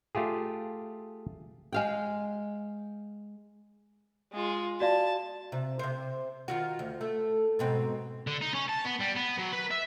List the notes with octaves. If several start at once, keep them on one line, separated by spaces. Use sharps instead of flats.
A3 F4 G4 G#4
G#3 F5 G5
G#3 F4
F#4 D5 F5 A5
C3
C3 C5
D#3 F4 F#4
D2
A3
G#2 B2 C4
D3
D#4
C#4
A5
B3
G3
B3
F#3
B4
E5